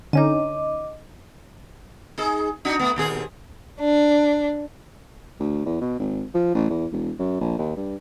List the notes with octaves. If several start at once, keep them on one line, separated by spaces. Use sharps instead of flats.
D3 C#4 D#4 D#5 D6
D#4 G#4
D4 D#4 F#4
A3 B3
D#2 A#2 G#4
D4
D2
E2
B2
G#1
F3
A1
E2
E1
F#2
A#1
D#2
G2